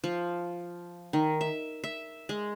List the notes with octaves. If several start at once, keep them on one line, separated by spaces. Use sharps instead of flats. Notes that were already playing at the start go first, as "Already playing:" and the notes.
F3
D#3
E5
E5
G#3